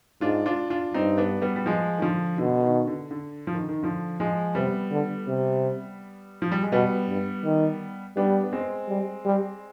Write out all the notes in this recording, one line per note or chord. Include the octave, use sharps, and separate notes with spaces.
G#2 D4 F4
D4 F4
D4 F4
G2 C4 D#4
B3 D4
G3 B3
G3
F3 G#3
D#3
D3 F3
B2 D3
D#3
D3
D3
F3
D#3
D3
D#3
D3 F3
F3 G#3
C3 G3 B3
D3
C3
F3
G3
G#3
B2 G3 B3
G2
D#3
G3 B3 D4
B3
G#3 C4
G3
G3